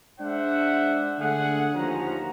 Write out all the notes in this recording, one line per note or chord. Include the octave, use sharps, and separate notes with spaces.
G#3 D4 C5 E5 F#5
D3 A3 G#4 F#5
D#2 F3 C#4 F#4 C5 A#5